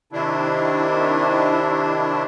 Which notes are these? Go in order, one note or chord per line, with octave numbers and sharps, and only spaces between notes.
C3 D#3 D4 E4